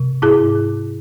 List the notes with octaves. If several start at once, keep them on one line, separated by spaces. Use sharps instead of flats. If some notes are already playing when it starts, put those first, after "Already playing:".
Already playing: C3
G#2 E4 G#4